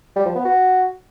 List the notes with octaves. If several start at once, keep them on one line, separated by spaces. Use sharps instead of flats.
G3
F3
B3
F#4